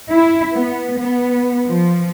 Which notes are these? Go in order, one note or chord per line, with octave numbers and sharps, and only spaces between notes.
E4
B3
B3
F3